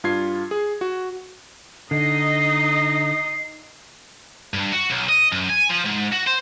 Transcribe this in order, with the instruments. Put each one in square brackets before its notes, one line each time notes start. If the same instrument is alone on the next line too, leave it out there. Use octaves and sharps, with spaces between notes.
[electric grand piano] G2 F4 G#6 C7
G#4
F#4
[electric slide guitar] D3 [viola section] D#4 D#5 [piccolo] C7
[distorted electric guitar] G2
F#4
B1
D#5
F#2
G#5
F3
G#2
F#4
C5